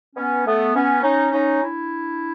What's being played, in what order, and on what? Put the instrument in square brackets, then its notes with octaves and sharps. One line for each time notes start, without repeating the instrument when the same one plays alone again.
[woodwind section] B3 C#4
A3 B3
B3 C#4
C#4 D#4
C#4 D#4
D4 E4